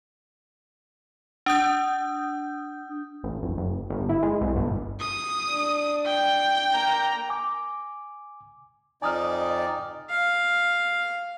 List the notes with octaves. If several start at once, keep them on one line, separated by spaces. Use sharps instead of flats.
D4 D#6 G6
A1
F1
F#1
G1
E4
G#3
C2
G1
D#6
D4
G5
A#3 A#5
G#5 D6
F2 D#4 D5 G#5 D#6 F6
F5